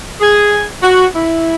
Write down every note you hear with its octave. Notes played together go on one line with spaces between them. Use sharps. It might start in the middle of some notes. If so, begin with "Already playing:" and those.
G#4
F#4
E4